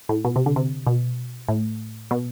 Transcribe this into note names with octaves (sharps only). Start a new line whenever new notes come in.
A2
B2
C3
D3
C3
B2
A2
B2